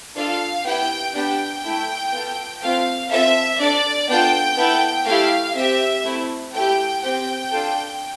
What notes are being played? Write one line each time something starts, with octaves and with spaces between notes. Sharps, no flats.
D4 F4 A4 F5
B3 E4 G4 G5
B3 D4 G4 G5
A3 E4 A4
B3 F4 A4
A3 C4 F4 F5
C4 F4 A4 E5
D4 A4 D5
B3 D4 F4 A4 G5
B3 E4 A4
A3 E4 G4 F5
C4 G4 E5
A3 C4 E4
A3 E4 G4 G5
C4 G4 G5
D4 F4 A4